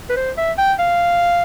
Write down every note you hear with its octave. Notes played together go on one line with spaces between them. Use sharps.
B4
C5
E5
G5
F5